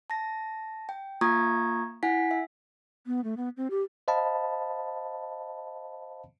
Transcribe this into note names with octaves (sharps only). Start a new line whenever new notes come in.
A5 A#6
G5
A#3 F4 A#5 C#6 D#6 G#6
E4 F#5 G#5 B6
E5
B3
A3
B3
C4
G4
C5 D#5 F5 A5 B5